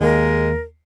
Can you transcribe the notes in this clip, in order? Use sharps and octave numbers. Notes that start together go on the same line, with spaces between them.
D#2 G#3 A#3 A#4